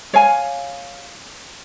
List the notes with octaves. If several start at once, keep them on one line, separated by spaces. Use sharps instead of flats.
C#5 F5 G#5